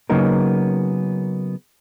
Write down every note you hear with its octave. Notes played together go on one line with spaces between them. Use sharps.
C#3 F#3 A#3 B3 D#4 A#4